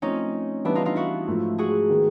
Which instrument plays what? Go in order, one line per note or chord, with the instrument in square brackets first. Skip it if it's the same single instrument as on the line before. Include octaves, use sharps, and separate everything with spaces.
[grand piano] F3 A3 C4 [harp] C#4 D#4
[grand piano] E3 G3 B3 [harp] D4 E4
[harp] D#4 F4
D#4 F4
E4 F#4
[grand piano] G#2 F3 A3
[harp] F#4 G#4
[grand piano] D#3 G#3 B3